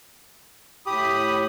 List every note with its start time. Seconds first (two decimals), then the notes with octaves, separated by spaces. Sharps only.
0.86 A2 G4 B5 D#6